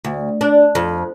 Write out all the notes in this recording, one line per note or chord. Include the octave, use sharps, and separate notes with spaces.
D2
D4
F2